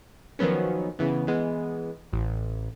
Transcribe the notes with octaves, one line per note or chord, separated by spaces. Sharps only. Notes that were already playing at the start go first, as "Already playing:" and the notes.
D#3 F3 F#3 B3 C#4
C#3 E3 B3
E3 G#3 B3
A1